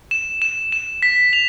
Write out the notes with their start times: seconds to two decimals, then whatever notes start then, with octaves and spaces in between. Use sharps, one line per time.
0.11 E7
0.42 E7
0.72 E7
1.03 B6
1.33 F7